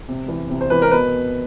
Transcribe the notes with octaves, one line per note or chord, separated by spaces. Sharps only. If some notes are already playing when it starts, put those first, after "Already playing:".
C3
E3
C3
C5
E3 B4
A#4
B2 B4